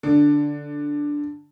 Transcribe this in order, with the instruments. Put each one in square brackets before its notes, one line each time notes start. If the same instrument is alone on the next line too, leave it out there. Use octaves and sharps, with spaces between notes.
[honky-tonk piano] D3